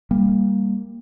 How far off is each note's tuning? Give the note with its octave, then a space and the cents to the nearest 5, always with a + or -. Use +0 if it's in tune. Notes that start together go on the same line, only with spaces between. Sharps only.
G3 +15 A#3 +0